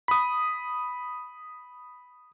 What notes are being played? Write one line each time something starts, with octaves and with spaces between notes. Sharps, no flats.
B5 D#6